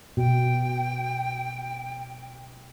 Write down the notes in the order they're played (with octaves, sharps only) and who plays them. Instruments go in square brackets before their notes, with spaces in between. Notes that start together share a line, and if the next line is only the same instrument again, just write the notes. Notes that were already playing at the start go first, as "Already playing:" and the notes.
[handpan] B2 [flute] G5